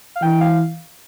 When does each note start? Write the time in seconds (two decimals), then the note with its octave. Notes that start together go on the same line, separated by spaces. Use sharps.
0.16 F5
0.22 E3 G5
0.41 F5